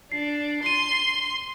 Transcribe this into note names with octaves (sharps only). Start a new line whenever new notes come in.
D4 C7
C6 C7 D#7